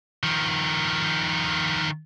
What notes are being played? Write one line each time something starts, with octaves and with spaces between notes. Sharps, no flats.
D#3 F3